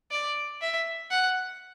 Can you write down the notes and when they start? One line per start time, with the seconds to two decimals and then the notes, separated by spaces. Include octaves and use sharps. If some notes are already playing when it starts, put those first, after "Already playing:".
0.11 D5
0.61 E5
1.11 F#5